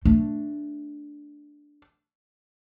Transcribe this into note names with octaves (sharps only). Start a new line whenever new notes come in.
A3 D4